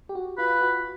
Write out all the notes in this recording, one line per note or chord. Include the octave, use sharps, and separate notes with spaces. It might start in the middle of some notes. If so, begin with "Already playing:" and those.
G4
F#4
F4 B4
F#4